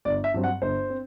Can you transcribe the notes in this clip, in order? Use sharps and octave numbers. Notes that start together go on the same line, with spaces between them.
G1 D5
E5
G2 F#3 C4
F#5
G1 C5
C4